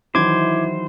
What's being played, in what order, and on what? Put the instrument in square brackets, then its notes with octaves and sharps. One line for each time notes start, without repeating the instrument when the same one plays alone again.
[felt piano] D#3 E3 F#3 [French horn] E4 [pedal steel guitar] C5 [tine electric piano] D6 G#6